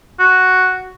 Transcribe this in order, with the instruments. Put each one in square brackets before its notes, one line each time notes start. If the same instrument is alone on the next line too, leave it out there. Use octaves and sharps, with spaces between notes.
[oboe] F#4